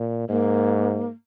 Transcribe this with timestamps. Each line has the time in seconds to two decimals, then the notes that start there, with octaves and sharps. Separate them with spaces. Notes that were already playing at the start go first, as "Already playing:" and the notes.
Already playing: A#2
0.29 G#2 A#3